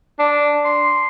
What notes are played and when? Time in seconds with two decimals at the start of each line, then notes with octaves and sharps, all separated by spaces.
0.19 D4
0.65 C6